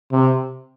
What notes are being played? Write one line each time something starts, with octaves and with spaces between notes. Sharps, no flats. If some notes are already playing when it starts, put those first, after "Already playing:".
C3